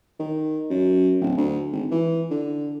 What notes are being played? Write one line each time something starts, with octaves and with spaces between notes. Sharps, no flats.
D#3
F#2
D1
D2
G#1
E3
D3